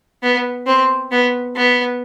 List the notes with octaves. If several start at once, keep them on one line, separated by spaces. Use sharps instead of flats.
B3
C4
B3
B3